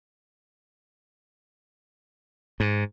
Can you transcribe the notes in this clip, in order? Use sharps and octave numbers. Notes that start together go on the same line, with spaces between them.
G#2